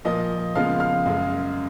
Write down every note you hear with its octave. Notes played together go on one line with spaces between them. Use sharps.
A#2 F3 A#3 D#5 D#6
C#3 F3 G#3 B3 F5 F6
F5 F6
F#2 C#3 G#3